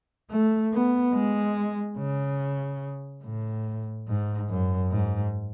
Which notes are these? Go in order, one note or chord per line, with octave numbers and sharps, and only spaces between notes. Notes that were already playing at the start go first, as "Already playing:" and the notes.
A3
B3
G#3
C#3
A2
G#2
F#2
G#2